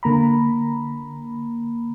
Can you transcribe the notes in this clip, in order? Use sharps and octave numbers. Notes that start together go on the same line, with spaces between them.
D3 A#3 A#5 B5